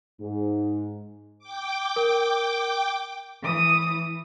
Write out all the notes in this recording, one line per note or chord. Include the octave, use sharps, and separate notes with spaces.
G#2
G5 D6
A#4
E3 D#6